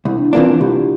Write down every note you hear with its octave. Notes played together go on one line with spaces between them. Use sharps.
C2 E4
D4
E4
C3 E3 A#3 D4 F4
C2 G4